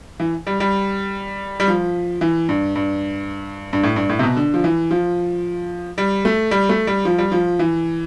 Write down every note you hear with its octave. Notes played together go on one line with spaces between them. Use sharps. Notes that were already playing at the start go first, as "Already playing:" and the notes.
E3
G3
G3
G3
F3
E3
G2
G2
G2
A2
G2
A2
C3
B2
D3
F3
E3
F3
G3
A3
G3
A3
G3
F3
G3
F3
E3